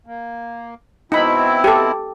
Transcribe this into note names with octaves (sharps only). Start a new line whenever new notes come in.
A#3
B2 C4 D#4 E4 B5
G4 A4